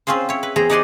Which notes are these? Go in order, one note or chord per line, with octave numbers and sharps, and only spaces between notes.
C4 C#4 F4 G#4 C5
E4 C#5
B4
E2 G#4 C5 G5 A#5
D#4 G4 D5 F#5 G#5 C6